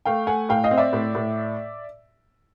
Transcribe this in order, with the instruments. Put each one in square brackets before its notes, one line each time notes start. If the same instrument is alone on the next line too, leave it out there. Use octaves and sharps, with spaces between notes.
[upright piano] A3 F5 G5
A3 F#5 G#5
A2 F5 G5
D#5 F5
C4
D5 E5
A2
A2